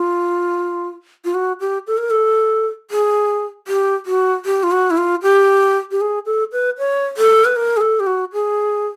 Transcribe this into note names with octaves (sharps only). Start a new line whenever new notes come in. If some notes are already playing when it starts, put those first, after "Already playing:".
Already playing: F4
F4
F#4
G4
A4
A#4
A4
G#4
G4
F#4
G4
F4
F#4
E4
F4
G4
G4
G#4
A4
B4
C#5
A4
B4
A#4
G#4
A4
G4
F#4
G#4